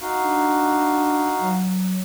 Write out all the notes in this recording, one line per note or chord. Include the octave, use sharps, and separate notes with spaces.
D#4 F#4 F5
D4
F#3